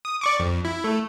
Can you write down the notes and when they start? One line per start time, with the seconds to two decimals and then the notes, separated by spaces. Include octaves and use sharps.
0.05 D#6
0.21 D5 C#6 D6
0.40 F2
0.65 E4
0.84 A3